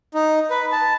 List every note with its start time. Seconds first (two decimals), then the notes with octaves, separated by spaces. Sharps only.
0.14 D#4
0.50 B4
0.72 A5